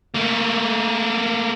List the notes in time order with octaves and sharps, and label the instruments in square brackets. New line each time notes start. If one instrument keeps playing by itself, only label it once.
[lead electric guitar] A3 A#3